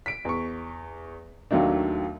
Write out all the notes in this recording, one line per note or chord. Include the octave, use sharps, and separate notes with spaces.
B6 D7
E2 C#6
D#2 D#3 F#3 A3 D4